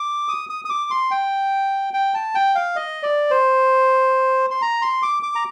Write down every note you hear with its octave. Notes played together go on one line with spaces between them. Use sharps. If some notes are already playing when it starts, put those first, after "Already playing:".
Already playing: D6
D#6
D#6
D#6
D6
C6
G5
G5
A5
G5
F5
D#5
D5
C5
C6
A#5
C6
D6
D6
A#5